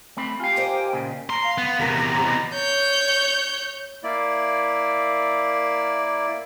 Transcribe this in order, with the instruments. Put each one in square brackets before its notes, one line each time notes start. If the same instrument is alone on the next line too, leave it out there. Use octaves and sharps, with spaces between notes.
[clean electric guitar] A3 C4 B5
[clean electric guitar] F4 F5 [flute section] G4 G5 G#5
[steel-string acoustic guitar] A#4 C5 D#5
[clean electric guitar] A#2 C#3
[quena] A#5 [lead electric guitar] C6
[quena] F5
[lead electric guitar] B3
[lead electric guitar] E2 C3 [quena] A#4
[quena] A#5
[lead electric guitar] B2 E3
[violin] C#5 G6
[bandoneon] A#3 E4 D5